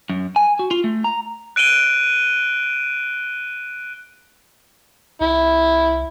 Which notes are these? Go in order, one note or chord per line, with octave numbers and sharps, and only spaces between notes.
F#2
G#5
F#4
F4
A3
A#5
F#6 D7 D#7 G7
C2 E4